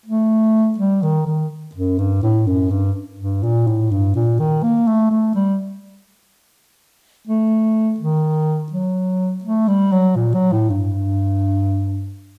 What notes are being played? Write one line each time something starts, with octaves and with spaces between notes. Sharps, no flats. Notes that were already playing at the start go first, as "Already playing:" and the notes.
A3
G3
D#3
D#3
F#2
G2
A2
F#2
G2
G2
A#2
A2
G2
A#2
D#3
A#3
A3
A3
G3
A3
D#3
F#3
A3
G3
F#3
A#2
F#3
A2
G2